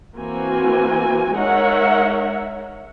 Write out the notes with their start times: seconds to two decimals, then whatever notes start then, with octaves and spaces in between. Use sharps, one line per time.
0.17 E3 A#3 C4 F#4 G#5
1.36 G#3 D#4 A#4 C#5 E5 F#5